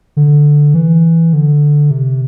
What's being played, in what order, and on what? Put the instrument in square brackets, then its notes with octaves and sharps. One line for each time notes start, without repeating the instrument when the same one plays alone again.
[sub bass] D3
E3
D3
C3